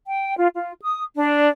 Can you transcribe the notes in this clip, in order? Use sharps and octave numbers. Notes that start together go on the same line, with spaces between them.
G5
F4
F4
D#6
D4